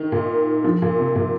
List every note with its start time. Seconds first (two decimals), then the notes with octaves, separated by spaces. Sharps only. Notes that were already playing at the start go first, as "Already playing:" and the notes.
Already playing: D#3
0.12 A#2
0.65 F3
0.82 A#2
0.98 C3
1.16 A#2